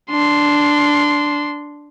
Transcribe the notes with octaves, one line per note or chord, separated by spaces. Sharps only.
D4 C6